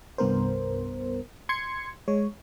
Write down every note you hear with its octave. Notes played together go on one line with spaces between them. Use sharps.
C2 G2 B3 A#4 C5
C6 G#6 C#7
G#3 C#5